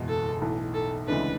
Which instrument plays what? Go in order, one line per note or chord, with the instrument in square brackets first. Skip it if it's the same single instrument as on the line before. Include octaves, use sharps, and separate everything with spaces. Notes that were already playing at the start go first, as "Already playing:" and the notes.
Already playing: [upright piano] F#1 E2 B2 G#3
[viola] A4
[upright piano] B1 A2 E3
[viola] A4
[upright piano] D2 C#3 E3 G#3 D4 [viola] B4